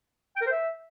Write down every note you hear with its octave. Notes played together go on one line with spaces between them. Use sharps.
G5
A#4
C5
E5